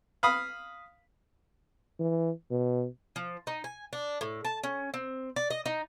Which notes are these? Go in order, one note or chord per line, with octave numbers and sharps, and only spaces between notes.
F5 B5 D#6
E3
B2
F3
D#4
G#5
D4
A2
A5
C#4
C4
D5
D#5
D#4